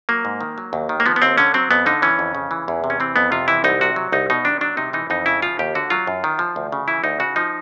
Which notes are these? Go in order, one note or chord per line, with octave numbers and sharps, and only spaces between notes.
F#3 A#3
G#2
D#3
F#3
D#2
D#3
A#3
F3 B3
B3
D#2 C4
D3 C#4
F#3 C4
F2 B3
D3 D#4
E3 C#4
F2
C#3
E3
E2
C3
C#4
E3 C4
F2 B3
C3 F4
E3 E4
C2 D#4
C3 F#4
F#3
C2 D#4
B2 D#4
D#3 D4
F#3 D4
C3 D#4
E3 D#4
F2 D#4
C#3 E4
F3 F4
D#2 G4
D3 F#4
F#3 F4
F#2
D#3
F3
D2
C#3
E3 E4
D2 D#4
C#3 F#4
F3 D#4